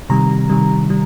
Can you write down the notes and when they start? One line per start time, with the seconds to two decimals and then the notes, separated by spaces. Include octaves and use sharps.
0.10 C3 D#3 G3 A#5
0.50 C3 D#3 G3
0.90 G3